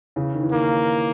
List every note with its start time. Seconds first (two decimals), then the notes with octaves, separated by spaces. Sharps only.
0.16 C#3 E3
0.34 D#3
0.43 E3
0.51 D#3 A#3